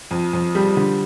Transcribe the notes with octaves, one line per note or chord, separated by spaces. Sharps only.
F2
F2
G3
D3